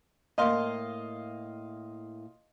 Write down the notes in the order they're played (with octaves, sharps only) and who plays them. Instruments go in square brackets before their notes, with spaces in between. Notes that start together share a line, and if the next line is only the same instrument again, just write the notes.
[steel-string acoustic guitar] A2 A#3 [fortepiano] D#5 F5 C6